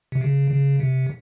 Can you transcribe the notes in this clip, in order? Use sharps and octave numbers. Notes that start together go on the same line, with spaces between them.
C3
C#3
C#3
C3